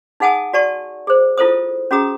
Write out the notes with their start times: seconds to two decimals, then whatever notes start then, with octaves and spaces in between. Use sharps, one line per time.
0.20 D#4 G#4 F#5 G#5 A5 D#6
0.53 F#4 D5 A5 C#6
1.07 G#4 C5
1.38 E4 F4 A4 C5 D#6
1.91 C#4 F#4 G#4 A#5 D#6